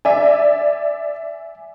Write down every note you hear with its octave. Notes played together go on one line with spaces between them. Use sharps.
D5 E5 G#5